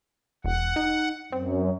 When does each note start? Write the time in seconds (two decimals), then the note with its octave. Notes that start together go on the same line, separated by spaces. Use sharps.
0.44 E1 F#5
0.76 D#4
1.32 F#2 C4